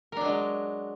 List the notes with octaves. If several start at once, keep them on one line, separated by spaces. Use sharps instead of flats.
F#3 G#3 D4 A#4